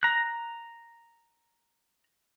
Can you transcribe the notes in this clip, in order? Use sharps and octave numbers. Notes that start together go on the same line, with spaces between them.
A#5 F#6